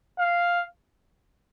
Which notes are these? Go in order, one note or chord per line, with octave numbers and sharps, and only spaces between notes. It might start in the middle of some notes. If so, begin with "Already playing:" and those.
F5